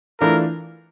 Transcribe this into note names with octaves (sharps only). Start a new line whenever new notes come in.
E3 A3 D4 F4 A#4